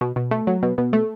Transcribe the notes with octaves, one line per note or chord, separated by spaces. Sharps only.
B2
B2
A3
F#3
B2
B2
A3